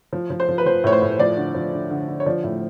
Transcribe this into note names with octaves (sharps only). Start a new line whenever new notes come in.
F3
F3
C5
F3
B4
F3 C5
A2 C#5
C5
A2
F3 D5
D3
F3
D3
D3
D3
C#5
F3 D5
A2